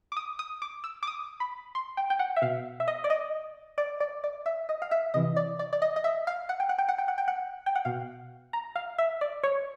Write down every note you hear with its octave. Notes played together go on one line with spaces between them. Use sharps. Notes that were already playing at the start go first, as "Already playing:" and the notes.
D6
D#6
D#6
D6
E6
D6
D#6
B5
C6
G5
G5
F#5
E5
B2 F5
E5
D#5
D5
D#5
D5
D5
D5
E5
D#5
F5
E5
C3 E3 D#5
D5
D5
D5
D#5
D#5
E5
F5
F#5
G5
F#5
G5
F#5
G5
F#5
G5
F#5
G5
F#5
B2 F5
A#5
F5
E5
D5
C#5